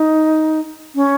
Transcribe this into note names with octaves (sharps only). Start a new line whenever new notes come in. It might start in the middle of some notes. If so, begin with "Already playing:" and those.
Already playing: D#4
C#4